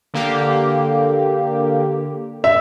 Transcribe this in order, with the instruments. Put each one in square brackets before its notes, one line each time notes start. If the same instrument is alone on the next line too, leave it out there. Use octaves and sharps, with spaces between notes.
[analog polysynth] D3 A#3 G4
[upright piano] E5